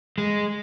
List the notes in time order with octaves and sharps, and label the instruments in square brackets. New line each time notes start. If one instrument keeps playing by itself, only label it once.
[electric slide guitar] G#3